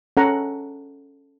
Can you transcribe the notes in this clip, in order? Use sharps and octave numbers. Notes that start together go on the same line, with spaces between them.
C#4 A4 F#5 A#5